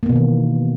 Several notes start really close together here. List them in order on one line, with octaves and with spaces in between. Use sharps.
A#3 B3 B2 E3 D#3